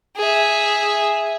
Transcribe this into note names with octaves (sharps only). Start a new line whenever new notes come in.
G#4 E5